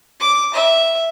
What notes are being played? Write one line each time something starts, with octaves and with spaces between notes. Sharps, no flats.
D6
E5